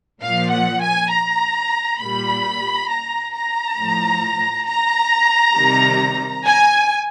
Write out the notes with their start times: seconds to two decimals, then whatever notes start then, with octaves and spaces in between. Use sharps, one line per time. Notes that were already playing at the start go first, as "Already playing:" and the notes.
0.21 A#2 F3 F5
0.51 F#5
0.81 G#5
1.11 A#5
1.99 A#2 G3 B5
2.89 A#5
3.34 A#5
3.79 A2 F3
4.67 A#5
5.56 C3 D#3 G3
6.46 G#5